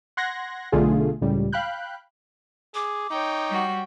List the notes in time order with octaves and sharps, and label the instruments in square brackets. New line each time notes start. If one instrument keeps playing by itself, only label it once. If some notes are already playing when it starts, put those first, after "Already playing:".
[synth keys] F#5 C6 F#6 G#6 A#6
B1 D3 A3 F4 G#4
C#2 A2 G3
F5 G5 B5 F#6 G6
[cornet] G#4 [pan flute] D6
[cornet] D#4 [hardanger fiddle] C#5 G5
[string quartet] G3 F#4